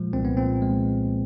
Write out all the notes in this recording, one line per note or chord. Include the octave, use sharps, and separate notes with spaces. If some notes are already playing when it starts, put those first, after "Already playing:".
Already playing: A#2 F3 G#3
C2 C4
B3
A#2 C4
G#3